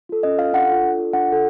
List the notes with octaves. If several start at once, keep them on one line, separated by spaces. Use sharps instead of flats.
F4 A4
C#4 D#5
F4 A4 F5
D4 F#5
F4 A4
D4
F4 A4
D4 F#5
F4 A4